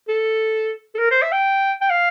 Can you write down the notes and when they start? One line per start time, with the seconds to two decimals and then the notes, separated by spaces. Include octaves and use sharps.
0.08 A4
0.95 A4
0.99 A#4
1.11 C5
1.22 E5
1.32 G5
1.81 G5
1.90 F5